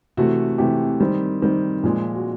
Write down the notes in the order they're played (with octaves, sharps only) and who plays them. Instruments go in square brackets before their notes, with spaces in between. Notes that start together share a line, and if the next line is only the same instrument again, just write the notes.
[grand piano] C3 E3 A3 F#4
C3 E3 A3 G4
D#3 G3 C4
D#3 G3 C4
A#2 F3 G#3
F#4